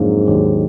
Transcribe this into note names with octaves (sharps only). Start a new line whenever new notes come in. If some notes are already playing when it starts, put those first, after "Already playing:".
Already playing: F2 G#2 D3 F#3 A#3
D#2 D3 F#3